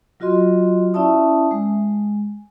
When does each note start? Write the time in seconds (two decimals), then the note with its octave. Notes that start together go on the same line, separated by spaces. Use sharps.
0.20 F#3 F4 F#4 D#5 C6
0.94 C#4 E4 D5 E5 A5 D#6
1.51 G#3